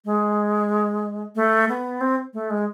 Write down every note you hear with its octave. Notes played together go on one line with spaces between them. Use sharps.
G#3
A3
B3
C4
A3
G#3